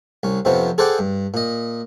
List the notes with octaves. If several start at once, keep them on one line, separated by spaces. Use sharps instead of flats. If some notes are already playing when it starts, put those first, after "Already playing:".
C2 C#4
F2 C3 F3 B3 C#4
G#4 A4 C5 D5 F#5 G5
G2
A#2 D#5